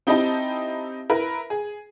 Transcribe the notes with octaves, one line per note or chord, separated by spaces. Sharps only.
C4 D#4 E4 G4 D#5 A5
E4 A#4 B4
G#4